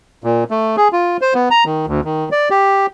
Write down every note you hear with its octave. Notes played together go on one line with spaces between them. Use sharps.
A#2
A3
G#4
F4
C5
B3
A#5
D#3
D2
D#3
D5
G4